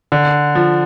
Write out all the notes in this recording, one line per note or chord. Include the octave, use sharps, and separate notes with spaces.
D3
F3